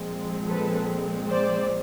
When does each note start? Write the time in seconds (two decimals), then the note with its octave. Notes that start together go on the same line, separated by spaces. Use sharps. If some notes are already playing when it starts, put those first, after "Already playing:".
Already playing: A#2 F3 G#3 C4
0.46 A4 B4
1.29 C5 D5